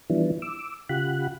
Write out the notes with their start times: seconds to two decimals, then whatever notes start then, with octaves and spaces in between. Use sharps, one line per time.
0.10 E3 F3 G3 B3 D4 E4
0.42 D6 E6
0.89 C#3 F4 G4 F#5 B5 F#6